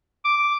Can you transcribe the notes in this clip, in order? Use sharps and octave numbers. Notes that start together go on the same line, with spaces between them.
D6